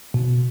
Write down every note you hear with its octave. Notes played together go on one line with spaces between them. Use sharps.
B2